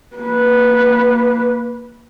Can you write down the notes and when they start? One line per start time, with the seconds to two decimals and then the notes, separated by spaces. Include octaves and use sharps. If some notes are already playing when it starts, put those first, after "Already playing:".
0.16 A#3 B4